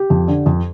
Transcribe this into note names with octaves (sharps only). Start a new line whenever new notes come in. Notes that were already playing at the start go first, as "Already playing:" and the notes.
Already playing: G4
F2
D3
F2